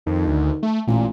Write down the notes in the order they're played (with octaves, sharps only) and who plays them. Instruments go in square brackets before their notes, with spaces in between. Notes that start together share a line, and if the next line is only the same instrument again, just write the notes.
[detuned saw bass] F2 [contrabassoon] D#3
[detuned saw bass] D2
A3
[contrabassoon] A1 [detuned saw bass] A#2